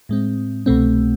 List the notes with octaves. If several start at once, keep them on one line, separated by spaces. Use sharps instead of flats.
A2 G#3 C4
C2 B2 A3 C4